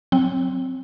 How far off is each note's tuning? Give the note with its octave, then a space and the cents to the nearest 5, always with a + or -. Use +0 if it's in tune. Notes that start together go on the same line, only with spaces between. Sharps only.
F#3 -20 C4 +0